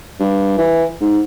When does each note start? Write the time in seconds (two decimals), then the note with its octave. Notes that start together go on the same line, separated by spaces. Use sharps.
0.20 G2
0.58 E3
1.01 G#2